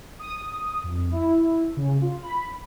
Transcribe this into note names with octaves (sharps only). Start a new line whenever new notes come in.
D#6
F2
E4
C#3
F4
B5